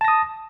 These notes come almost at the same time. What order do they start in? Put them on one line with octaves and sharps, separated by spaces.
A5 A#6 D#6